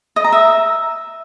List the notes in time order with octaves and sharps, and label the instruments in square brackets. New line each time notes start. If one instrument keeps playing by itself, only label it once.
[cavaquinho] D#5
A#5
E5